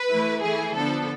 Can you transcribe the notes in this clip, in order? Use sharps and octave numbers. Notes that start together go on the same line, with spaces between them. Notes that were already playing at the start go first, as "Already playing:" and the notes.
Already playing: B4
E3 A3 E4
E3 A3 E4 G#4
D3 F3 B3 D4 A4